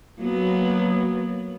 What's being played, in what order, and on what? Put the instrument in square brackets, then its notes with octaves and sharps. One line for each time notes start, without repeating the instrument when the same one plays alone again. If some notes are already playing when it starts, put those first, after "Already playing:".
[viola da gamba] F#3 A#3 B3